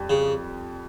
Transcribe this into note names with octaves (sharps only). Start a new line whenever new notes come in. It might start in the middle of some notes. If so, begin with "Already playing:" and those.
Already playing: F2 G3
C#3